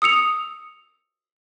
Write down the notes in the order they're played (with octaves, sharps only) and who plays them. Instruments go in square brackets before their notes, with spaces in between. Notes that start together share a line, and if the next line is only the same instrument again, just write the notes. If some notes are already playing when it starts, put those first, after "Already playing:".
[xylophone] D#6 E6 C#7 F7